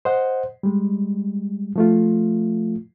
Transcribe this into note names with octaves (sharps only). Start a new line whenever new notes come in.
C5 D#5 F#5
G3 G#3
F3 A3 F4